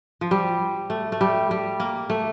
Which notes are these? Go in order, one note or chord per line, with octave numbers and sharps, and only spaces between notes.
F3
G3
A3
A3
G3
G3
A#3
A3